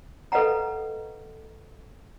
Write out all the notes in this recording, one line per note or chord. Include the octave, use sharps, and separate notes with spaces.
A4 B4 D#5 F5 F#5 A#5